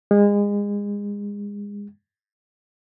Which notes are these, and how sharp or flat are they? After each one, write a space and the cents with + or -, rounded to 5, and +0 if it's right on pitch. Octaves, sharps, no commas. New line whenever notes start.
G#3 -30